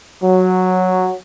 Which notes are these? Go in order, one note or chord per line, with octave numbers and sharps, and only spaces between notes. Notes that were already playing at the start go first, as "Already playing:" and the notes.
F#3